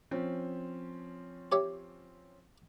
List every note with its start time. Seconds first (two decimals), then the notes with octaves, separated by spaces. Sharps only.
0.11 F3 C4 C#4
1.52 G4 C#5 E5